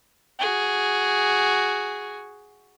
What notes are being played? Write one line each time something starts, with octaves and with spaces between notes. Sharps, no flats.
F#4 G#4